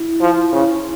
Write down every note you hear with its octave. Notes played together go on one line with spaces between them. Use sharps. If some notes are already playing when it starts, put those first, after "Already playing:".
Already playing: E4
F3
C#3
E4